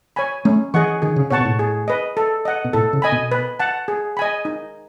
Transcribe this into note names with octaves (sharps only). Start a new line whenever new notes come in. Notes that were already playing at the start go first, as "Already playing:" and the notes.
C#5 G#5 B5
A3 C#4
E3 G#4 D#5 F#5 C#6
D#3 G#4
C#3
B2 C#5 F#5 A5 C#6
B2
A2
G#4
B4 D#5
A4
D#5 F#5
B2
A2 A4
C#3
D#5 G#5 B5
B2
B4
F#5 A5
G#4
D#5 G#5 B5
D#4